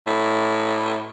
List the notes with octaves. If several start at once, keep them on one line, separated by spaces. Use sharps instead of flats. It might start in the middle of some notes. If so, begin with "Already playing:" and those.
A2